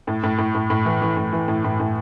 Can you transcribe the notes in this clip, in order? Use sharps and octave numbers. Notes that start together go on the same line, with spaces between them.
A2
A2
A2
A2
A2
E3
E3
A2
E3
A2
A2
A2